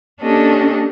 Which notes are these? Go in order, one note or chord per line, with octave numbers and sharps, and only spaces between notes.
A#3 C#4 D4 G4 A4 D#5